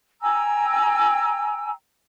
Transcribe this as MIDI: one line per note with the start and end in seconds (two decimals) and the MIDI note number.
0.22 1.70 79
0.22 1.70 80
0.22 1.70 82
0.22 1.70 88